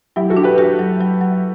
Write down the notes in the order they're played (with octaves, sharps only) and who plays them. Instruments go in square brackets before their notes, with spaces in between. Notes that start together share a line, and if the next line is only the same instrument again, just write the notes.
[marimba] F#3 [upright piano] E4 G4
[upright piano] F#4 A4
[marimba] D4
[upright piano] G4 B4
[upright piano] F#4 A4 [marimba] G4
[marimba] F#3
F#3
F#3